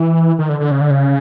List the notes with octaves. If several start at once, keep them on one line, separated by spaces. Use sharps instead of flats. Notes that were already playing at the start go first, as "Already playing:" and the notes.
Already playing: E3
D#3
D3
D3
C#3
D3
C#3